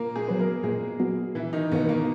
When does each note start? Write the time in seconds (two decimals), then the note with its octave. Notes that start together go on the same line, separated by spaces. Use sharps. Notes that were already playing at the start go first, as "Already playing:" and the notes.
Already playing: A#2 A#3 A#4
0.16 G#3 G#4
0.28 F#3 B3
0.40 A#3 A#4
0.63 A#2 G#3 G#4
1.00 F#3 B3
1.35 A#1 E3 E4
1.53 D#3 D#4
1.71 G#2 B2 D#3 A#3 B3
1.83 B3
1.89 A#3